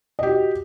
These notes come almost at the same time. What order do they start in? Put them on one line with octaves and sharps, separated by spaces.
D#5 G4 F#4